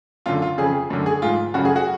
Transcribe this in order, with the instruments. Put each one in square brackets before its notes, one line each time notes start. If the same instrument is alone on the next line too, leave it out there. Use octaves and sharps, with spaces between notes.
[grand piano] F#2 D3 F4
F4
F2 C#3 G#4
F#2 D3
G#4
G#2 F4
F#2 C#3 F#4
G#4
F#4